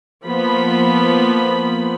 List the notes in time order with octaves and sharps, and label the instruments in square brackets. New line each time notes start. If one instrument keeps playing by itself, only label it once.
[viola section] F3 A#3 B3 B5